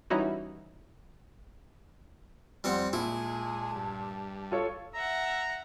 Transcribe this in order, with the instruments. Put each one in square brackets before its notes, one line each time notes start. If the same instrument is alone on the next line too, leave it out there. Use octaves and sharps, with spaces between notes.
[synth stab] E3 G3 C#4 D#4 E4 F#4
[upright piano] F2 [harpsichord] G3 C4 F#5 [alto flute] C6
[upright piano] A#2 [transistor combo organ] G#3 [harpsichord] E4 [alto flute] A5
[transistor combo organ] G2
[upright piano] F4 A4 C#5
[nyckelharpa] E5 F#5 [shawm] A#5